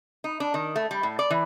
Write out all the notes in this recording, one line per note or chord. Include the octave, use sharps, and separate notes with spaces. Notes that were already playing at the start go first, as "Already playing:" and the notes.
D#4
D4
D#3
A3
G3
A2
D5
E3